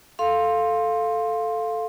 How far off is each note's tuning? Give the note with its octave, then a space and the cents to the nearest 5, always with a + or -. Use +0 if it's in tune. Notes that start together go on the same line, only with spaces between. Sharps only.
A4 +0 F5 +0 C6 +10